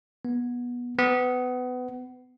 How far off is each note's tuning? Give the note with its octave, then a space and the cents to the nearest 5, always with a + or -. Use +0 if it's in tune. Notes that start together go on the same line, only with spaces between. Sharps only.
B3 -20
B3 +25